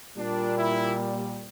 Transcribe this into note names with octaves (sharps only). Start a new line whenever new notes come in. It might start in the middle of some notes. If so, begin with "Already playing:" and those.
A#2 G3 D4
E4